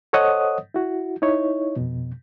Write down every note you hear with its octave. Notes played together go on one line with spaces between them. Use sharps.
A4 C5 C#5 D#5 F#5 D#6
E4 F#4
D#4 E4 C#5
F2 B2